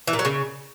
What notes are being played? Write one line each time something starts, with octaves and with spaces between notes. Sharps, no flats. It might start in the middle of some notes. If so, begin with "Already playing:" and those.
E3
A#2
F#3
C#3